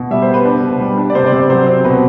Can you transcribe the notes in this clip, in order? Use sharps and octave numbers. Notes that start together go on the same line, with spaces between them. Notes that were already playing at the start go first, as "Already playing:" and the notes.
Already playing: B2
G3 E5
C5
B3
B4
D4
B2
G3
D4
D5
C3 C5
D5
C3
C5
F#3 C5
C4
B2 B4